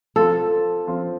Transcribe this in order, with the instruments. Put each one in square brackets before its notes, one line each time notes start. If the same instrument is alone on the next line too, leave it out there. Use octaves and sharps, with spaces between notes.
[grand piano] F3 C4 F4 [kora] A4
[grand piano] F3 C4 F4